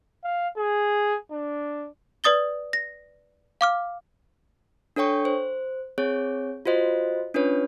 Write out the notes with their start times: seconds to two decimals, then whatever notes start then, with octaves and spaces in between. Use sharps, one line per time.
0.24 F5
0.57 G#4
1.31 D4
2.24 B4 D5 D#6 A6 G7
2.73 A#6
3.61 F5 D6 F6
4.96 D4 A4 C#5 G5 C#6
5.25 C5
5.98 C4 G#4 C#5
6.66 F4 F#4 C5 D#5
7.34 C#4 D4 F4 B4 C#5